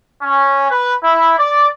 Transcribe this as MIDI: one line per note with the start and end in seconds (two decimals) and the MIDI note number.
0.22 0.67 61
0.70 0.93 71
1.02 1.34 64
1.38 1.67 74